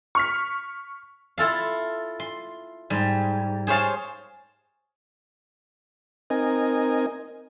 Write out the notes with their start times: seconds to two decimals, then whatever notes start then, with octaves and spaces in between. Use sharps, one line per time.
0.15 C#6 F6 B6
1.38 E4 F4 A4 F5
2.20 C6
2.90 G#2 G3
3.67 G#4 C5 C#5 F5 A5
6.30 C4 D#4 A#4 D#5 G#5